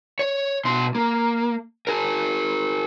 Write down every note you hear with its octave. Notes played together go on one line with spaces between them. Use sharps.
C#5
B2 C6
A#3
G#4 A#4